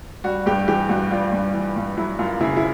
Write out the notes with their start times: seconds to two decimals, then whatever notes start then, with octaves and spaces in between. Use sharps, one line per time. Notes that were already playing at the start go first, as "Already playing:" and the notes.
0.24 G3 F#4
0.46 G2 G4
0.67 E3 G4
0.89 G2 F#4
1.11 G3 F4
1.32 G2
1.54 E3
1.76 G2
1.97 F#3 E4
2.19 F#2 F4
2.40 C#3 E4
2.57 E4